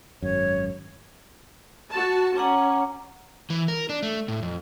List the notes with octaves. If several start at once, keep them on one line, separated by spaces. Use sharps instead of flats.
G#1 F#2 C#5
F#4 A5
C#4 F#5 A#5 D6
E3
A#4
D4
A3
A2
F2